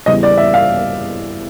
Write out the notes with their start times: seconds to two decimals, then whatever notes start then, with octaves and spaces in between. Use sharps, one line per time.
0.06 E2 C#3 E3 G3 D#5
0.23 D5
0.37 E5
0.54 F5